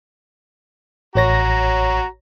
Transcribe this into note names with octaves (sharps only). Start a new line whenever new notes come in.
A1 F#4 C#5 A#5 A#6